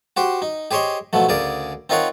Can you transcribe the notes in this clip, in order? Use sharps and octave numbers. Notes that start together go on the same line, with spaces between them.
F#4 G4 C5
D#4
G4 G#4 C5 C#5 D#5
B2 F3 F#3 A3
D2 C#3 G#4 A#4 D5
C4 D#4 F4 A#4 C#5 F#5